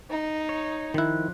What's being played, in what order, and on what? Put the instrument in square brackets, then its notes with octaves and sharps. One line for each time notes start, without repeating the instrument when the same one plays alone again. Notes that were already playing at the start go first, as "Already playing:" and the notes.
[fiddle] D#4
[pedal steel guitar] C#5
[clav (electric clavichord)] D#3 E4 [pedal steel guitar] F3 F#6